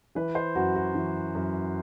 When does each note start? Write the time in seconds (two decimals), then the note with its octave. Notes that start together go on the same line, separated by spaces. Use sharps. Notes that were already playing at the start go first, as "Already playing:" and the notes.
0.15 E3 B4
0.35 C5
0.55 F#2 F#4
0.76 F#4
0.94 E3
1.35 F#2